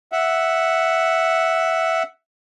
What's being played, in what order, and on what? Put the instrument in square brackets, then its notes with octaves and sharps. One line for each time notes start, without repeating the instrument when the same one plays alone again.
[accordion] E5 F#5